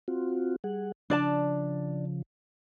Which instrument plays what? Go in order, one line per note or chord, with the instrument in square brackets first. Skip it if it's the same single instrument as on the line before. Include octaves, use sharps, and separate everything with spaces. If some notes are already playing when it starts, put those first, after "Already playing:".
[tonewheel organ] C4 F4 F#4
G3 G#4 F#5
[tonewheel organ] C#3 F3 [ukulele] D4 D5 A5